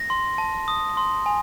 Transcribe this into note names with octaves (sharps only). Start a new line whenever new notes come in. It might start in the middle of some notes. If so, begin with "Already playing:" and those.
Already playing: A#6
C6
A5
D#6
C6
G#5